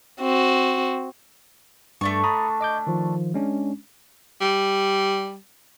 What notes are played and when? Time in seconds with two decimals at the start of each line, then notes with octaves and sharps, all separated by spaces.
0.20 C4 F#4
2.01 G2 A3 D4 C#6
2.24 A#5 B5 D#6
2.61 D#5 D6 G6
2.87 D#3 F3
3.34 G#3 C#4 D4
4.41 G3